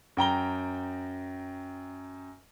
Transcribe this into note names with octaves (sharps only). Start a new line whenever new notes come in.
F#2 G5 A#5 G7